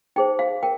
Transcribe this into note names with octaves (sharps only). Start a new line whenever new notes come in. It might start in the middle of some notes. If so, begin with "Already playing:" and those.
D#4 G#4 C5 G5
F5
A#4 G5